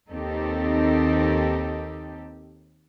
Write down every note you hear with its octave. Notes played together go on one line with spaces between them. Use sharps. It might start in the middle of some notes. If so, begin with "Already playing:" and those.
D#2 D#3 C4 D#4 G4 A4